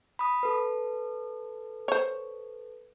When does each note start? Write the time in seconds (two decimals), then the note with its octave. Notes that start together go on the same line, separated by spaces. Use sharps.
0.19 B5 D#6
0.43 A4 B4
1.88 C5 C#5